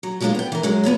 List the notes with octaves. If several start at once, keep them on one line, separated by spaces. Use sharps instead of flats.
F#3
F3 F#3 G#3 C#4 D4 F4
B3 G5
E3 A#4
F#2 F#3 G#3
F3 B3 C#5 E5